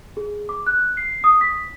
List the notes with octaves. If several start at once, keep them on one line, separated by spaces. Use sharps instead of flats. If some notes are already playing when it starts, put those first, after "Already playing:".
G#4
D6
F#6
C7
D#6
B6